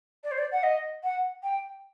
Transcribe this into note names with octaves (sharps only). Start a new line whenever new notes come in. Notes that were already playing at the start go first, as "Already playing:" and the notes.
D5
C5
D5
F#5
D#5
F#5
G5